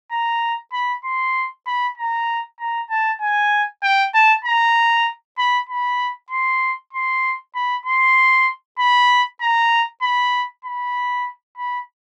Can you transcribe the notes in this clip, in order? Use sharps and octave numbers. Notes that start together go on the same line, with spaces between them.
A#5
B5
C6
B5
A#5
A#5
A5
G#5
G5
A5
A#5
B5
B5
C6
C6
B5
C6
B5
A#5
B5
B5
B5